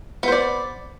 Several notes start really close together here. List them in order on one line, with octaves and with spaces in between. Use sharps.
B3 C5 D5